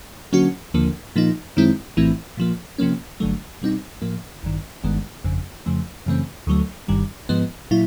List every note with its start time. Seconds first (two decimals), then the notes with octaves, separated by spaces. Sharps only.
0.33 D3 F#3 A#3 C#4 F#4
0.74 D#2 D3 F3 A#3
1.16 A#2 F3 A#3 D#4
1.57 F#2 D#3 G#3 C4 E4
1.97 A#1 A2 E3 A3 C4
2.37 A#2 F3 A#3
2.78 C3 F3 A#3 C#4
3.20 G1 G2 D3 F#3 A3
3.61 B2 G3 C4 D#4
4.02 A2 F3 A#3
4.43 A1 G2 D#3
4.84 G1 G2 D#3 G#3 B3
5.24 G1 F2 C#3
5.66 F2 C#3 F3 A3
6.06 F#2 C#3 E3 A3 C4
6.47 D2 D3 F#3 A3
6.88 G1 G2 D#3 G3
7.29 G#2 F3 G#3 B3
7.71 A#2 F#3 E4